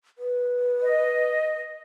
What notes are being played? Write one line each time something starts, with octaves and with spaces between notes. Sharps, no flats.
B4
D#5